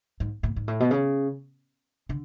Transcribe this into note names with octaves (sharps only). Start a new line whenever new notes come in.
G#2
A2
G#2
A2
B2
C#3
D3